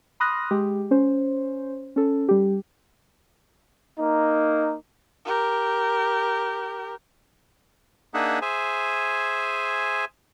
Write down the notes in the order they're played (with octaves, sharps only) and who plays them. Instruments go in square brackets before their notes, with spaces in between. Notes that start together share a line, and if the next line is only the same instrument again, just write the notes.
[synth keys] B5 C6 D#6 F6 F#6 A#6
G#3 G4
C#4 C5
C#4 A4
G3 G4
[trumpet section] A#3 D#4
[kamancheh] G4 A#4
[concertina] A#3 D4 D#4 G#4 E5 F#5
G#4 C5 E5 G#5